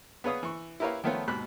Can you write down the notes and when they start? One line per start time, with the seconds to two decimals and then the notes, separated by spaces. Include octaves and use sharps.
0.24 B3 G#4 B4 C#5 F5 D#6
0.43 E3 C#6
0.80 E4 G4 A#4 B4 C#5 F5
1.04 D#3 F3 A3 B3 C#4 F4
1.28 D#2 G#2 B2 B5 F#6